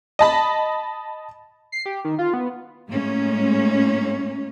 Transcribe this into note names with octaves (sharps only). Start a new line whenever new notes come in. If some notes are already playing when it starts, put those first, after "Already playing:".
D#5 A5 B5
C7
G4
D#3
F4
B3
A2 G#3 A#3 C#4